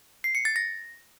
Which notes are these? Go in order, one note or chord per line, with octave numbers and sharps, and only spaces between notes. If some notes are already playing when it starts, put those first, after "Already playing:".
C7
C#7
A6
A#6